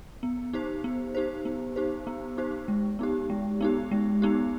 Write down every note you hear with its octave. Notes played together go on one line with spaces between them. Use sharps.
B3
D#4 G4 C5
B3
D#4 G4 C5
B3
D#4 G4 C5
B3
D#4 G4 C5
G#3
B3 D#4 G4
G#3
B3 D#4 G4
G#3
B3 D#4 G4